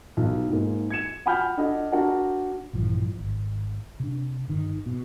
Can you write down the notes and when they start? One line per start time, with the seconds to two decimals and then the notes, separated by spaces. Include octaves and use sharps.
0.17 B1
0.49 G#2 A#3
0.90 G#6 C#7 E7
1.26 F#5 G5 B5 F6 G6
1.57 D4 A4 D#5 F#5
1.92 D4 F#4 A#4 F#5 A5
2.73 A#1 G2 E3 F3
3.19 G#1
4.00 C3 D4
4.48 G1 D#3
4.86 B2